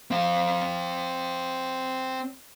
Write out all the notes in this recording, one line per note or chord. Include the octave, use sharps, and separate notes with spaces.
C4 F5